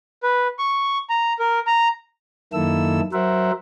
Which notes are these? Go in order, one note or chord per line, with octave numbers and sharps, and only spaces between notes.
B4
C#6
A#5
A#4
A#5
F#2 D#3 A#3 E4 A4 E6
F#3 A#4 C5 E5 F#5